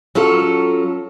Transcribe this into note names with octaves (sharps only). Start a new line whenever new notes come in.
F#3 C#4 F4 A4